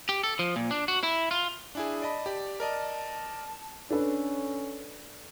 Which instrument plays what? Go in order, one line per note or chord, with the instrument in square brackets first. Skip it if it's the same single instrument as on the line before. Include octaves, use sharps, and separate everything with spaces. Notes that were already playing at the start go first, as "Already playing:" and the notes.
[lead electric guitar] G4
A4
F3
A#2
D4
F#4
E4
F4
[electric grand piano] D4 E4 G#4 [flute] G#5
[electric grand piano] D5 D#5 B5 [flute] A5
[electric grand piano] G4 D5
[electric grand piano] A#4 D5 D#5 [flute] A5
[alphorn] C#4 [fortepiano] D4 A4 B4